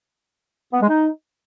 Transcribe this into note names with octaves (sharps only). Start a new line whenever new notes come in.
B3
G#3
D#4